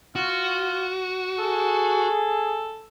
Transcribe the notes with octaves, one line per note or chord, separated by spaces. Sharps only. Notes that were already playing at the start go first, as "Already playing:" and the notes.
F4 F#4
G#4 A4